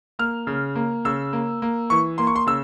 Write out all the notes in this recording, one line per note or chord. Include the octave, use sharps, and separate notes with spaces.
A#3 F6
C#3
A#3
C#3 E6
A#3
A#3
E3 C#6
A#3 C6
C#6
C6
C#3 E6